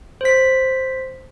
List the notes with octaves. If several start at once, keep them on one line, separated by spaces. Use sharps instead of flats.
C5 B6